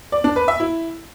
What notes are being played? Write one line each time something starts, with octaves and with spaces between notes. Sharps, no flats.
D5
D4
B4
E5
E4